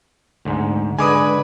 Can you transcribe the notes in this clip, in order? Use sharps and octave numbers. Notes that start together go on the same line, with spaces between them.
D2 G#2
D3 G#3 B4 G#5 D6 D#6